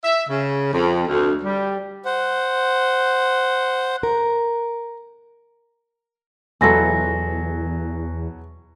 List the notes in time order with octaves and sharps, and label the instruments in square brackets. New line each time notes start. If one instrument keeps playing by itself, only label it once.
[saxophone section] E5
C#3
F2
D2
G3
[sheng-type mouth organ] C5 F#5
[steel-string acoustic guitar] A#4
[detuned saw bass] E2 [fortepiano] B2 F#3 [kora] E4 F4 A4 [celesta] G#5 A#6